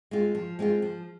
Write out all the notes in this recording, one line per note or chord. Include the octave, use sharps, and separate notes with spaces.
G#3 C4 F4
F3
G#3 C4 F4
F3